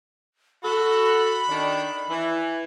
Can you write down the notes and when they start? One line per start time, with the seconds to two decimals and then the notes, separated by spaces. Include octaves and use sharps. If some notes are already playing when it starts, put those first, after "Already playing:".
0.63 F#4 A4 B5
1.49 D#3 D4
2.09 E3